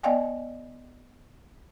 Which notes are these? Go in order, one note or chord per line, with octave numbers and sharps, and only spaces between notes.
B3 D5 D#5 F5 G5 G#5